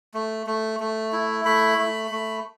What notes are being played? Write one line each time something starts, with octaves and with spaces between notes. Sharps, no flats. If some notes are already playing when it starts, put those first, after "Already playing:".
A3
A3
A3
E4
A3 B5
A3
A3